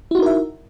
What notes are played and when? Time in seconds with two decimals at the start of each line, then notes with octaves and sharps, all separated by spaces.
0.11 E4
0.15 F#4
0.19 D#4
0.22 A#4
0.26 E5